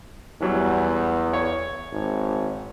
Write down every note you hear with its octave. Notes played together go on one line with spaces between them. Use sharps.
E2 E3 F#3 G3
C#5
G#1